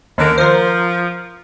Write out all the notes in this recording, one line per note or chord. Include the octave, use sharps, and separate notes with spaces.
D#2 D3 C#4 A#4
F3 A#4 C5